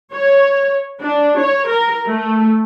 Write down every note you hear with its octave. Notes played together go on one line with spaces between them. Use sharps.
C#5
D4
C#5
A#4
A3